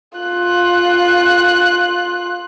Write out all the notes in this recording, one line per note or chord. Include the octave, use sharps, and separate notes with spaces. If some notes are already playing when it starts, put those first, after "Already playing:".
F4 F#6